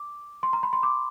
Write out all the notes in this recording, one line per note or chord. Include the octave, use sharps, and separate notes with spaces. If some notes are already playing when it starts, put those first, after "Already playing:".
Already playing: D6
C6
A#5
B5
C6
D6